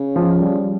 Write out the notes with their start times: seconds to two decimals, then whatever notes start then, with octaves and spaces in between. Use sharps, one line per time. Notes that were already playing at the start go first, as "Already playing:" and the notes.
Already playing: C#3
0.16 F3
0.40 G3